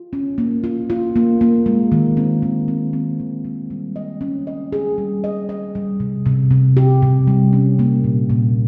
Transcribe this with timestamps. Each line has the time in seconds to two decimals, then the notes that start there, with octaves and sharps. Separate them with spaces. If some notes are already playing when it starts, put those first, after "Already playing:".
Already playing: F4
0.13 C#4
0.38 A#3
0.64 F4
0.90 F4
1.16 A#3
1.41 A#3
1.66 G#3
1.92 D#3
2.17 C4
2.42 D#3
2.68 C4
2.93 C4
3.20 D#3
3.45 G#3
3.70 G3
3.96 D#5
4.21 C#4
4.47 D#5
4.72 G#4
4.98 G3
5.24 D#5
5.49 D#5
5.75 G3
6.00 C3
6.26 C3
6.51 C3
6.77 G4
7.02 C3
7.27 G3
7.53 C#4
7.79 A#3
8.04 A#2
8.30 A#2